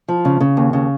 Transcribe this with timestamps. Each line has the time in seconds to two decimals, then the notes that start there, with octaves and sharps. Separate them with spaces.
0.08 F3
0.25 C#3
0.40 C#3
0.57 D#2
0.73 C#3